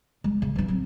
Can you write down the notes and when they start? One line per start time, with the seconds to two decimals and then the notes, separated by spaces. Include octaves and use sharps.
0.24 G#3
0.42 C#3
0.56 E3 D4
0.68 F#3 C4